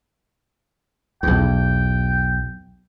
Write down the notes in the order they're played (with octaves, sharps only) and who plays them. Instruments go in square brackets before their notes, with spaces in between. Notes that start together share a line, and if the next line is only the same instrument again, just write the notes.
[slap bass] B1 E2 [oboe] G5